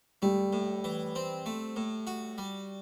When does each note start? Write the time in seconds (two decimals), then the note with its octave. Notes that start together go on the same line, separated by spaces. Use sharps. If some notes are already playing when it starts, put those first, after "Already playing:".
0.22 G3 A3
0.53 A2
0.84 E3
1.15 C4
1.46 A3
1.76 A2
2.07 F#4
2.38 G3